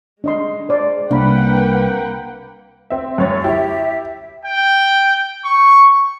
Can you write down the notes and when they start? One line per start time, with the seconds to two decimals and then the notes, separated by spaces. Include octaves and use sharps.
0.24 G#3 D4 D#5 C6
0.69 C5 D5 C6
1.11 C2 A#3 D4 B4 F#5 G5 B5
2.90 C4 E5
3.18 F#2 C#5 A6
3.44 E4 G4 E5
4.45 G5
5.45 C#6